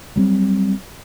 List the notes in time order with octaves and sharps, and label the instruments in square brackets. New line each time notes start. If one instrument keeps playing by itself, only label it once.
[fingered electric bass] F#3 G3 C4